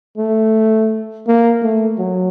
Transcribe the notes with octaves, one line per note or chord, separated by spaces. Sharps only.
A3
A#3
A3
F#3